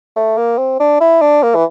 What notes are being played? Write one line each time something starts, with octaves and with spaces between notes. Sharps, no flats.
A3
A#3
C4
D4
E4
D4
A#3
E3